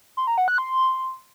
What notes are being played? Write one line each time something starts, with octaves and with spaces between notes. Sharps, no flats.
C6
A#5
F#5
F#6
C6